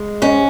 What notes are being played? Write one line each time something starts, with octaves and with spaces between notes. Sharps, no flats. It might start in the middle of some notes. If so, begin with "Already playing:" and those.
Already playing: G#3
G#2 C#4